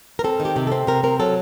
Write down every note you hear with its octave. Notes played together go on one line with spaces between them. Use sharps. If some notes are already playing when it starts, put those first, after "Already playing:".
A#4
C4 A4
D#3
G4
C3
C4 A4
C3 A#4
C4 A#4
F#3 A4